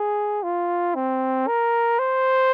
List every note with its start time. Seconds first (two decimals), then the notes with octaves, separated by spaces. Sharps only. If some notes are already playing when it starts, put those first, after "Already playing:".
Already playing: G#4
0.43 F4
0.95 C4
1.47 A#4
1.99 C5